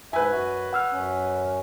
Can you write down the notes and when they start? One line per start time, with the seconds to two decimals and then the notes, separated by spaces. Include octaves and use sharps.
0.13 G#2 B4 E5 G#5
0.31 F#2 F#4
0.73 F#5 E6 F6
0.92 F#2 C#4